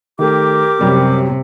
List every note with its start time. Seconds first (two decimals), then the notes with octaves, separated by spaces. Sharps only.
0.19 D#3 A3 G4 A#4 D6
0.81 F#2 C3 G3